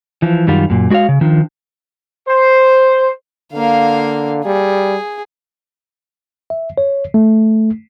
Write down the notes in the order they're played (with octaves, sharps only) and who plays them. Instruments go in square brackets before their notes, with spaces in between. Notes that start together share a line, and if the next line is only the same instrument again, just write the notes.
[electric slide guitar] E3 F3
F#2 D#3 G3 F4
F#2 A#2
G#3 F#4 G4 C#5 F5
C#3
D#3 F3 D4
[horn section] C5
[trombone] D3 [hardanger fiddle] A#3 F5
[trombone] G3 [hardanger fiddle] G#4
[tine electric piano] E5
C#5
A3